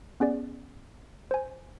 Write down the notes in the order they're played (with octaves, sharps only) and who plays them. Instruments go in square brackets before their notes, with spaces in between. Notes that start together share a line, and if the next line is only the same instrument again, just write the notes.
[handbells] B3 C#4 G#4 D5
C5 G#5